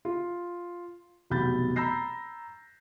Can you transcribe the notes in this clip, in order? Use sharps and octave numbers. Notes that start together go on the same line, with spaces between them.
F4
F1 B1 E2 B5 G6 A6
A#5 B5 E6 G6 A#6 C7